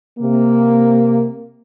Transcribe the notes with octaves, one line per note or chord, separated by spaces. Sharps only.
C3 A#3